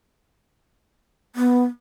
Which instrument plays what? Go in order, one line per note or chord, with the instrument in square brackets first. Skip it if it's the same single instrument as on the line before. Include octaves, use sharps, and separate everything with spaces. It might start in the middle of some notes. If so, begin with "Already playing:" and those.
[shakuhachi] B3